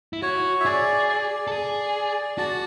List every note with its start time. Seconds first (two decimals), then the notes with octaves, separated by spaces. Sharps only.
0.13 E4
0.22 F#4 C#5
0.60 E5
0.66 G#4 D5
1.08 D5
1.47 A4
1.52 G#4
2.38 F#4 A5